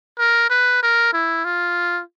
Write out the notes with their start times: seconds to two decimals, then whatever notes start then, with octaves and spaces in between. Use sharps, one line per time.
0.19 A#4
0.50 B4
0.83 A#4
1.13 E4
1.45 F4